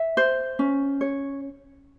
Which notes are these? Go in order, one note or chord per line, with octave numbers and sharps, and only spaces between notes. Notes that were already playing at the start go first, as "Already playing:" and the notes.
Already playing: E5
C5
C#4
C#5